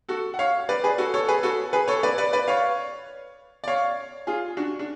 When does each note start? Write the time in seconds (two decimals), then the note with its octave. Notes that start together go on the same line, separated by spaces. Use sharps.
0.09 F#4 A4
0.34 F#5
0.39 C#5 F5
0.69 B4 D5
0.84 G#4 B4
0.98 F#4 A4
1.14 A4 C#5
1.28 G#4 B4
1.43 F#4 A4
1.73 G#4 B4
1.88 A4 C#5
2.03 B4 D5
2.18 B4 D5
2.33 B4 D5
2.48 C#5 F5
3.64 D5
3.68 C#5 F5
4.27 F4 G#4
4.57 D4 F#4
4.79 D4